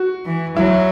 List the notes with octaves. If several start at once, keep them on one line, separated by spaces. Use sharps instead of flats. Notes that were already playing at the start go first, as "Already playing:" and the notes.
Already playing: F#4
E3
F#3 E4